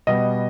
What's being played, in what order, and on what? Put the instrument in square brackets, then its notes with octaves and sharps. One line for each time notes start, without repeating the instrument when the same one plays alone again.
[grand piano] B2 G3 B3 D#5